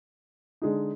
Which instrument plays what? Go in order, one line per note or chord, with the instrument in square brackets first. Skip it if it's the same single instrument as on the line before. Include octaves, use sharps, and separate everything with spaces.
[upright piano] D3 G#3 D#4